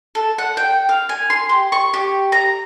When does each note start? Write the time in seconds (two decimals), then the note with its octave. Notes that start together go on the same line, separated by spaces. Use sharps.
0.15 A4
0.38 F#5
0.57 G5
0.89 F5
1.09 G#5
1.30 C6
1.49 G4
1.72 C#6
1.94 G4
2.32 A#5